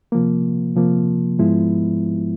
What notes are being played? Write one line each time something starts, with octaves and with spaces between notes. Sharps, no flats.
C3 F3 A#3
C3 F3 A#3
G#2 F3 G#3 B3 E4